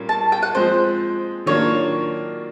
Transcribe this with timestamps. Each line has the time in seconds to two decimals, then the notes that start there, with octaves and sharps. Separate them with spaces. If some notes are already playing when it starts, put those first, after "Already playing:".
Already playing: A#2 G3 A#3 C#4
0.09 A5
0.32 G5
0.43 F#5
0.55 F3 G#3 C4 C5
1.46 D#3 F#3 A#3 D4 F4 C#5